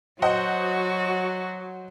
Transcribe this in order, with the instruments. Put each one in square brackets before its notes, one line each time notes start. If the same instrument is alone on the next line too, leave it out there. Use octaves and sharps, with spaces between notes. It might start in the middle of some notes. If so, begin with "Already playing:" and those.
[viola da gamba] F#3 [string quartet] F#4 [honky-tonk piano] C5 D#5 F#5